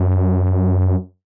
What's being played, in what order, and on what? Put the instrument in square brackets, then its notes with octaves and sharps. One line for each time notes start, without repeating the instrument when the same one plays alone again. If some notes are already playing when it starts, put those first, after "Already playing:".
Already playing: [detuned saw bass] F#2